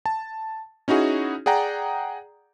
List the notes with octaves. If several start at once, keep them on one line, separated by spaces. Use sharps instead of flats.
A5
C#4 D#4 E4 F#4 G#4
G#4 D5 F#5 G5 A#5